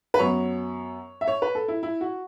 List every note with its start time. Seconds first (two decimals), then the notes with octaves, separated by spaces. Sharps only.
0.14 B4
0.19 F#2 F#3 B3 C#5
1.21 E5
1.28 C#5
1.42 B4
1.55 A4
1.68 E4
1.83 E4
2.01 F#4